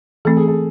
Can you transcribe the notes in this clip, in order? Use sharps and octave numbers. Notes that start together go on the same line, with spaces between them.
E3 A3 C4 A4
G#4
A4